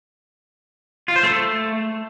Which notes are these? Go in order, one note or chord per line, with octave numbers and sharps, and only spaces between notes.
F4
C5
A3